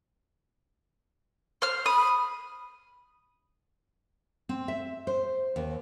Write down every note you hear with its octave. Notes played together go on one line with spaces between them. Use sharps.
C5 F6
B5 D#6
C4
E5
C5
D#2